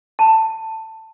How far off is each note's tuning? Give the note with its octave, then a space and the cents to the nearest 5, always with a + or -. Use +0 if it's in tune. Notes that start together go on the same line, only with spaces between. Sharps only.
A5 +15